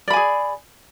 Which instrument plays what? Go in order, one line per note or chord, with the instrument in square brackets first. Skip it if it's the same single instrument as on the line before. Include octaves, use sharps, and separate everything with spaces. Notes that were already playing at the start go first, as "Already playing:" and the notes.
[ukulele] D5
B5
G#5
G#4